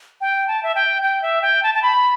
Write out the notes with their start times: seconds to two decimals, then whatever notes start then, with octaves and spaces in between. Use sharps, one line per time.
0.21 G5
0.48 A5
0.63 E5
0.75 G5
1.02 G5
1.22 E5
1.42 G5
1.63 A5
1.75 A5
1.82 B5